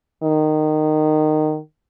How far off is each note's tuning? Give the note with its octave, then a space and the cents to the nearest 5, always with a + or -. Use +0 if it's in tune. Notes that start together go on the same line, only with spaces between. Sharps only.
D#3 -15